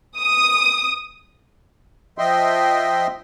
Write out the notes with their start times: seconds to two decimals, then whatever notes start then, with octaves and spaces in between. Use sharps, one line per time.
0.18 D#6
2.18 F3 D#5 E5 G5 C6